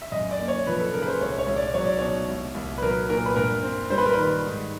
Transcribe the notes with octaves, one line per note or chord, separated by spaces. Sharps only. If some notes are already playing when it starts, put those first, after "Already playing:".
E5
F#2 D#5
D5
A#3
C#5
F3 B4
A4
C#3 A#4
B4
C5
C2 C#5
C#5
C2
D5
F#3 C#5
D5
B2 C#5
C2
C2
B4
F#3 A#4
A#2 A#4
B4
G2 A#4
C4
G3 C5
B4
A#4
D#3 B4
G#2